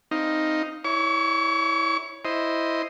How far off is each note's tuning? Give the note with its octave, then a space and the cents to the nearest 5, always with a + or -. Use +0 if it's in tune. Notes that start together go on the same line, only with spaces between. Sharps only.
C4 +0 D#4 +0 F5 +0
E4 -15 C#5 +0 C#6 +45
E4 +0 C5 +0 D#5 +0